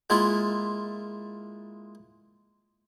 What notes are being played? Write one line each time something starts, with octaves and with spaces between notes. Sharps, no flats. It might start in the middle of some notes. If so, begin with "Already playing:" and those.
G#3 A#3 E4 F4